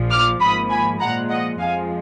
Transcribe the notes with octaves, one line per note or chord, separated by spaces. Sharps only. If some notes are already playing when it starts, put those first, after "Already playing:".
Already playing: A#1 A#2 F3
D6 F6
G#1 G#2 F3 A#3 B5 D#6
G#5 B5
A#2 F3 G#3 F#5 A#5
D#5 F#5
F2 F3 G#3 F5 G#5